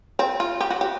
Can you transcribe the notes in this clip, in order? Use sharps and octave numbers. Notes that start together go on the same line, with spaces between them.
C4
F4
G4
F#4
G4